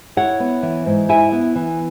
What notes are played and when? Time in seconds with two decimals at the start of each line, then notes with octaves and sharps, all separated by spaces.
0.17 E4 C#5 F#5
0.40 B3
0.63 E3
0.86 G#2
1.09 E4 E5 G#5
1.32 B3
1.55 E3